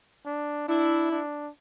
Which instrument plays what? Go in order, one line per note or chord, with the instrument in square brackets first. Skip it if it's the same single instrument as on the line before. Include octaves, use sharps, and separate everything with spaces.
[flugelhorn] D4
[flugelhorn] D4 [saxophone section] E4
[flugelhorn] D4